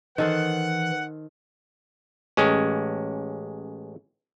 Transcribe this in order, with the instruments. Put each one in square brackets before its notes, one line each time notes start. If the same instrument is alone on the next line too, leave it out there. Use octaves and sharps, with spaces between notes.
[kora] D#3 A4 C5 [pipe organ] E3 [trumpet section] F#5
[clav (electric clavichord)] A1 G#3 C#4